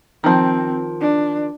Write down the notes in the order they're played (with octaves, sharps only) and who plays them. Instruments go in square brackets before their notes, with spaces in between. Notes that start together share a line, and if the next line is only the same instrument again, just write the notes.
[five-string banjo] D#3 F3 [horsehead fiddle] C4
[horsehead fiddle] D4